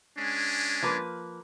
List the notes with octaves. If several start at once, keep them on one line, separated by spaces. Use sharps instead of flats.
G#3 C#4 D4
F3 A#3 B4